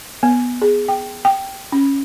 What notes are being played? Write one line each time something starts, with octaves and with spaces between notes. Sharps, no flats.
B3
G#4
G5
G5
C#4